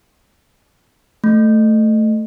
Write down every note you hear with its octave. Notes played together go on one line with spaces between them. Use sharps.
A3